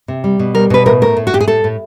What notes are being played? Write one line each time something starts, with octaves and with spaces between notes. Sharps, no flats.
C3
G3
B2
G3 A#4
B2 B4
A2 A#4
A3 A#4
A2
F#4
A2 G4
G#4
A2 A4
A2